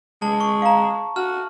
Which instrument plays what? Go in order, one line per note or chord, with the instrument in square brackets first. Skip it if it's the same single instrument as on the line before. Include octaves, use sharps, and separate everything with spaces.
[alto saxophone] G#3 [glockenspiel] A5
[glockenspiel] C#6
[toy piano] F5 A#5
[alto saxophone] F#4 [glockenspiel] F6